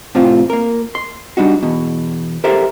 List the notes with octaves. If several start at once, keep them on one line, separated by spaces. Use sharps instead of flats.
A2 C3 F3 C4 F4
A#3 A#4
C6
G3 D4 D#4 F#4
E2 B2
G4 A4 A#4 C5 E5